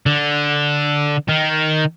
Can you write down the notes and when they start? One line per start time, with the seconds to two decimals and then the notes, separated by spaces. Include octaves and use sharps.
0.06 D3
1.29 D#3